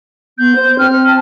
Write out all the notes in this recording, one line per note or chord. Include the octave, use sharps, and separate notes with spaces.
B3 G6
C5
C4 F6
A5